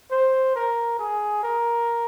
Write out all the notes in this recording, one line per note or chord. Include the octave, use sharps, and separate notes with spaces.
C5
A#4
G#4
A#4